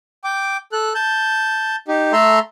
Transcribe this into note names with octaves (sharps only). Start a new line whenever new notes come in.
G5 D6
A4 F#6
A5 G6
D#4 G4
A3 A4 E5 A#5 C6